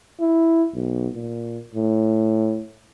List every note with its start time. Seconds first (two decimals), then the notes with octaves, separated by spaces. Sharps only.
0.20 E4
0.74 B1
1.14 A#2
1.75 A2